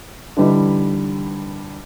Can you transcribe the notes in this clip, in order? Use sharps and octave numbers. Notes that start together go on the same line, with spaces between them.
D3 E3 G3 D#4 E4